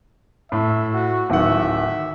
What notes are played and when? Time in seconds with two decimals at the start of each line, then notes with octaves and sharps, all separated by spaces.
0.52 A2 E5
0.94 F#4
1.30 D1 D#3 E5 F#5